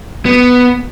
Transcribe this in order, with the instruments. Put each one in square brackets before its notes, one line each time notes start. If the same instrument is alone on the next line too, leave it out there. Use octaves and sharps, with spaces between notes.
[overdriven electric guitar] B3